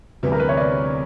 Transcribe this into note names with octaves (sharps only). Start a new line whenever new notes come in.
D2 C3 E3 G3 B3
A#4
B4
C#5
D5